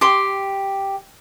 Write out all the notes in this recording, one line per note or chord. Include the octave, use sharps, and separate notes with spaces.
G4 C6